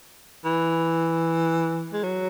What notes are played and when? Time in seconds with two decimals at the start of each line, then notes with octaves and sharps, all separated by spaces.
0.45 E3
1.93 G#3
2.03 F#3